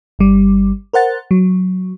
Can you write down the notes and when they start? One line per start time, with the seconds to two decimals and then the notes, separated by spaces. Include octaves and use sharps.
0.19 G1 G3
0.93 A#4 C5 F#5 A6
1.31 F#3